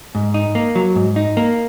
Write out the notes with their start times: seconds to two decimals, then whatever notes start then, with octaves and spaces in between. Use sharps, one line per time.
0.15 G#2
0.34 D#4
0.55 A#3
0.75 F#3
0.96 G#2
1.16 D#4
1.37 A#3